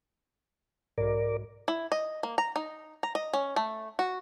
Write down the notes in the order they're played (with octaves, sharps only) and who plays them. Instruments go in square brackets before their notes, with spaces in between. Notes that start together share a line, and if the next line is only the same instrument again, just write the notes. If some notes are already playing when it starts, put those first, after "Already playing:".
[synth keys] B1 G#2 [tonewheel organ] A#4 D5
[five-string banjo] E4
D#5
A#3
A#5
D#4
A#5
D#5
C#4
A3
F#4